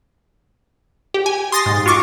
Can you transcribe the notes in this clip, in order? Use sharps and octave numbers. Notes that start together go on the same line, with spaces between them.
G4
G#5
C6 D#6 A6 A#6 C7
G#2
F4 F#4 C#6 D6